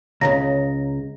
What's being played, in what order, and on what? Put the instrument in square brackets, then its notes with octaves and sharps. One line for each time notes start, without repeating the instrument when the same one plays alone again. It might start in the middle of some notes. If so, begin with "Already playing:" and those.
[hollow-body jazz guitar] C#2 A2 C#3 [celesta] A#5 A#6